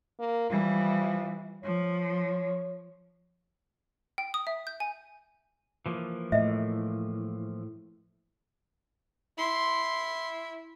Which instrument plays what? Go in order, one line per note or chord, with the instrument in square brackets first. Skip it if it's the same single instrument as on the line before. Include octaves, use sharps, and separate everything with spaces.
[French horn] A#3
[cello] E3 G3 [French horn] F3
[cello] F3 [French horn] C#5
[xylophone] G5
D#6
E5
G6
G#5
[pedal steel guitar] E3 F3 A#3
[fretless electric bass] A2 [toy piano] D#5 E5
[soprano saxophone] E4 [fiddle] C6